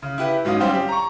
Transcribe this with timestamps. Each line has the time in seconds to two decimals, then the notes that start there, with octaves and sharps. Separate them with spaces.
0.02 C#3
0.18 E4 G4 B4
0.45 G#2 F#3 C#4 F5 D#6
0.60 G3 C4 C#4 C5 F5
0.74 G4
0.89 A#5 C#6